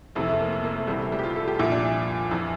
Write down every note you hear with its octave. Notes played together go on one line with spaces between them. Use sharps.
F2 C3 E3 A3
A3
A#3
A3
A#3
A3
C2 C3 E3 G3
A3
G3
G4
F4
A4
G4
C2 A#2 F3 E4
D4
E4
F2 E3